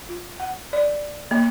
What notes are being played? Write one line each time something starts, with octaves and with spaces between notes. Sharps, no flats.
F4
F#5
D5
A#3